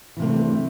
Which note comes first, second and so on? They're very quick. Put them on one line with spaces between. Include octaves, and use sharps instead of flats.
E3 C3 A#3 D4 A3